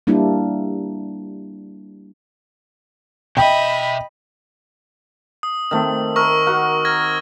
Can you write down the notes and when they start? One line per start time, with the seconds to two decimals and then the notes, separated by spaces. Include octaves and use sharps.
0.07 G3 A#3 D4 E4
3.37 B2 D#5 E5 G5 B5
5.43 D#6
5.71 D#3 A3 C4
6.16 A#4 C#6 E6
6.47 F#4 A#4 F#5
6.85 F6 G#6 A#6